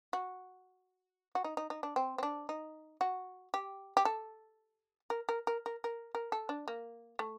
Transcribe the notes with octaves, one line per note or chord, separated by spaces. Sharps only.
F#4
F#4
D#4
D#4
D#4
D4
C4
C4
D4
D#4
F#4
G4
G4
A4
A#4
A#4
A#4
A#4
A#4
A#4
A4
D4
A#3
A3